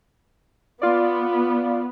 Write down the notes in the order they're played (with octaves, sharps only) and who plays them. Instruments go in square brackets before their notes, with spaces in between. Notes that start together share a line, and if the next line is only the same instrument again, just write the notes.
[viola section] B3 [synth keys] F4 D5